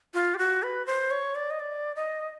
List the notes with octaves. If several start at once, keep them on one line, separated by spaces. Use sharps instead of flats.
F4
G4
F#4
B4
C5
C#5
D5
D#5
D5
D#5